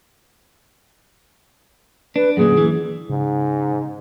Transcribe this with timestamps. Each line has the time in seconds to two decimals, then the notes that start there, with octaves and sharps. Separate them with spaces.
2.16 D4 B4
2.37 F#2 A#2 D3 G#4
2.57 E3
3.10 G#2 C#3